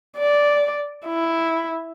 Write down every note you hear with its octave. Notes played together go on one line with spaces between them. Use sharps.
D5
E4